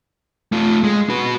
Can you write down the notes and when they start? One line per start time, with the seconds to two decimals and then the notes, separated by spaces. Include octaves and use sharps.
0.52 A3 F4
0.84 G#3
1.10 F#4 B4